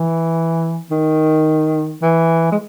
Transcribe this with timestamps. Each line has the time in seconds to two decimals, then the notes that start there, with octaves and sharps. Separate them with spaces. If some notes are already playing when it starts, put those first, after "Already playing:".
Already playing: E3
0.91 D#3
2.02 E3
2.52 G#3